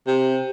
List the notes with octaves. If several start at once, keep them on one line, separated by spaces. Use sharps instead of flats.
C3